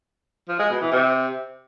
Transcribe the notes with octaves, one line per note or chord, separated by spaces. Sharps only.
F3
G#3
B2
E3
C3